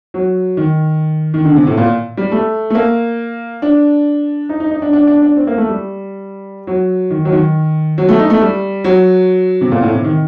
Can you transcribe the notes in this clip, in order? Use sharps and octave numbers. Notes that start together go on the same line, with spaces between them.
F#3
D#3
D#3
D3
C3
A2
A#2
G3
A3
A3
A#3
D4
D#4
D#4
D#4
D4
D4
D4
D4
C4
A#3
A3
G3
F#3
D#3
F#3
D#3
F#3
A3
D#4
A3
G3
F#3
C3
A#2
A2
C3
D#3